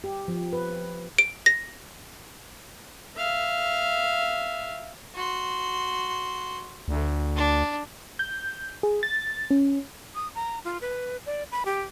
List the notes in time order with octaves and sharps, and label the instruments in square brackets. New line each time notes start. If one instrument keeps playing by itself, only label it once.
[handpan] G4
F3
B4
[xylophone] D7
A#6
[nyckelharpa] E5 F5
[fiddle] F#4 C6
[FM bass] D2
[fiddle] D4
[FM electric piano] G6
G#4
A6
C#4
[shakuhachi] D#6
A#5
F4
B4
D5
B5
G4